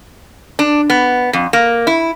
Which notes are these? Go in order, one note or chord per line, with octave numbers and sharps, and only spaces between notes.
D4
B3
F2
A#3
E4